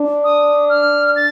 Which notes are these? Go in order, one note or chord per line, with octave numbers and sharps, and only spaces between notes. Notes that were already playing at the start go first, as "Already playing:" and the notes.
Already playing: D4
D#6
F6
A6